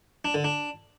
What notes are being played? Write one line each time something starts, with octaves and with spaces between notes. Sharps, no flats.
D4
D3
D4